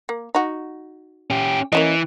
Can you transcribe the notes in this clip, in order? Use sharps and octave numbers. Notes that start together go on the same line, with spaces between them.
A#3
D#4 F#4
C#4 G4
E3 A#3 C#4 D#5